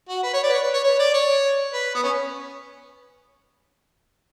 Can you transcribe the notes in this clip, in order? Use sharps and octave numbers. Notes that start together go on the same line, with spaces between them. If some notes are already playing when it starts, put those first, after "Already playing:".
F#4
B4
C#5
D5
B4
C#5
B4
C#5
C#5
D5
C#5
B4
B3
C#4